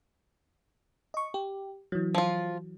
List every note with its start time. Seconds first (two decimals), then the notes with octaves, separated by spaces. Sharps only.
1.14 D#5 C#6
1.34 G4
1.92 E3 F#3
2.15 F3 F4